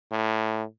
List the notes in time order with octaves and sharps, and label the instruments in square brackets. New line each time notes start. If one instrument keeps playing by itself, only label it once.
[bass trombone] A2